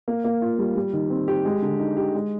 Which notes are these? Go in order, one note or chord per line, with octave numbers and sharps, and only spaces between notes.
A#3
A#3
F4
G3
G3
D#3
C4
G4
G#3
D3
D#4
G4
G#3